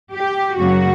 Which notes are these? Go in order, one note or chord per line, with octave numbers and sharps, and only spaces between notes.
G4
F#2 C#3 F#3 A#3 F#4